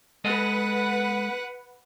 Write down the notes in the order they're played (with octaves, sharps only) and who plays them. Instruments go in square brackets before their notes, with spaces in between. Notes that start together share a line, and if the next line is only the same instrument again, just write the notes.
[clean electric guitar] G#3 A4 D#5 [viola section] B4 F#5